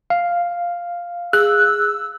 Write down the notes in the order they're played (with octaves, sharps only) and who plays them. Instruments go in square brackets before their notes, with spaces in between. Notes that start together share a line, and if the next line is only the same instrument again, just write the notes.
[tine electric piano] F5
[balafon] G#4 [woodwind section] E6 [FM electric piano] F#6